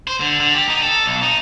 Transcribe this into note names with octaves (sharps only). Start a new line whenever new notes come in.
C5
D3
D3
G4
D#4
A4
B1
D#4